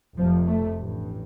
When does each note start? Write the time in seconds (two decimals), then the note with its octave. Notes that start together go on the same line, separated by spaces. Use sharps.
0.16 F1 F2 C3 F3
0.47 A3
0.77 A1 G2